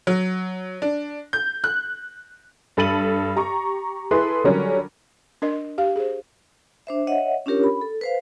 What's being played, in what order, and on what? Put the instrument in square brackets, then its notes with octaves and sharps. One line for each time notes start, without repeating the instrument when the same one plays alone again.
[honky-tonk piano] F#3
D4
G6
F#6
G2 A4 B5 A6 D#7 F#7
G4 A#5 C#6
E4 G#4 A4 B4 C6
D3 F#3 G3 C#4 A#4
[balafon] D4 A#4 D#5
G4 F5
G#4 C5
[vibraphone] D4 C5 E5
C#5 D#5 E5 F#5
C#4 D4 F4 G4 A#4 C#5
B5
A4
B4 C5 F5